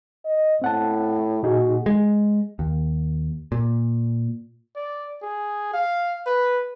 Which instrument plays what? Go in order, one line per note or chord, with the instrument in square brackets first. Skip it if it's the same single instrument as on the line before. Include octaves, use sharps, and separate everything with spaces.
[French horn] D#5
[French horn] A2 [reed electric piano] C4 F#5 A5
[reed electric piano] A#2 D#4 G#4 [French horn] F#4
[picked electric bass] G#3
D#2
A#2
[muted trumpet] D5
G#4
F5
B4